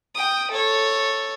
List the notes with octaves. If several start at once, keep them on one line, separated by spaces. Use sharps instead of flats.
G5 D#6
A4 C#5